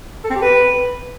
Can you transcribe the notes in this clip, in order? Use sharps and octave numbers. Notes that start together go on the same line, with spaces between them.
A4
C4
G4
B4